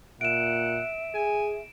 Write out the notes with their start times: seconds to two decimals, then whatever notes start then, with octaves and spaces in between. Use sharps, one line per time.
0.21 A#2 E5 F#5 D7 E7
1.15 G#4 G#5